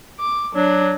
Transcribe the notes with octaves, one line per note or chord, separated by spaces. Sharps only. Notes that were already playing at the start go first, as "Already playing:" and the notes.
D6
F#3 D4